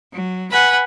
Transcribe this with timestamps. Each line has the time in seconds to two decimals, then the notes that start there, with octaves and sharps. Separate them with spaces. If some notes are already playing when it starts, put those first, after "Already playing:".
0.12 F#3
0.51 B4 F#5 G#5 B5